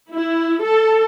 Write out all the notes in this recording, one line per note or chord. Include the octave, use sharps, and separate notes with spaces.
E4
A4